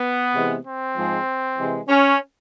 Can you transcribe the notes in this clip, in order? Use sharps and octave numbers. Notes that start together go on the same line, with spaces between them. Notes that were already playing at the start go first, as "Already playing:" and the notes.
Already playing: B3
C3 E3 G#3
C4
G#2 F3 G#3
C3 E3 G#3
C#4